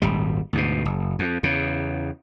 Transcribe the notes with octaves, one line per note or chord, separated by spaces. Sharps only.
D#1 G#1 G3
D2 G#2 B2
F#1
F2
E2 C#3